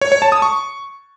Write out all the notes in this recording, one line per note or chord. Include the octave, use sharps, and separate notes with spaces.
C#5
C#5
A5
D#6
C#6